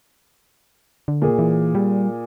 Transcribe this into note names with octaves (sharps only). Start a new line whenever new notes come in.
D3
A#2 G#4
E3
G3